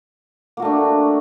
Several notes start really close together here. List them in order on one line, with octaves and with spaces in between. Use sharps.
A#3 F#4 A3 D4